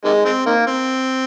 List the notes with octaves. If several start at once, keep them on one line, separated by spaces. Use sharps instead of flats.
C3 D#3 G#3
G#3 C4
D#3 A#3
C4